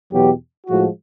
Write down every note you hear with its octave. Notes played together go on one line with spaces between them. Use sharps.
E2 B2 F#3 G4
A2 F3 G#3 F#4